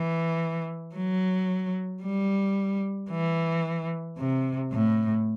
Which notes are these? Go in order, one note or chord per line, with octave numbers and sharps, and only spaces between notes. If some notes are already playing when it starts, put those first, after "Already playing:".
Already playing: E3
F#3
G3
E3
C3
A2